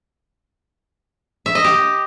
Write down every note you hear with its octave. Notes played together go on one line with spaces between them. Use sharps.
E5
D#5
G4